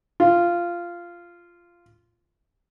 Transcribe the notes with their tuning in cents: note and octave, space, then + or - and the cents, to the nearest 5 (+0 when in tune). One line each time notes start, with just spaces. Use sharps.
F4 -10